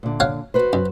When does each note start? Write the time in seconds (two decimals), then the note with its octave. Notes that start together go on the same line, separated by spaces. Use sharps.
0.03 A#2 D3
0.20 C#5 F5 F#5
0.54 F#4 B4 C5
0.73 F#2